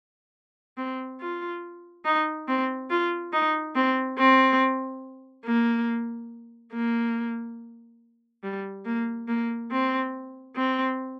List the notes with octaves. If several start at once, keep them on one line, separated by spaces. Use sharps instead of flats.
C4
F4
D#4
C4
F4
D#4
C4
C4
A#3
A#3
G3
A#3
A#3
C4
C4